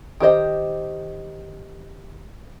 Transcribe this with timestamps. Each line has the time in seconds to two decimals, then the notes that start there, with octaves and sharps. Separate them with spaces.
0.20 D#3 G4 C5 D#5